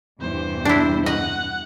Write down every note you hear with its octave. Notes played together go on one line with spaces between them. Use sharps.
E2 G2 C3 C5
D4 E4
D#5 F#5